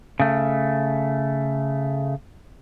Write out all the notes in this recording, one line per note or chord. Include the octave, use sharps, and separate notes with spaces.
C#3 A3